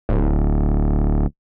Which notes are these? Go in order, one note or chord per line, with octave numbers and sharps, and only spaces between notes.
D1